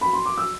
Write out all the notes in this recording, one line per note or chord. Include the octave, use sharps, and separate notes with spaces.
B5
C6
D6
E6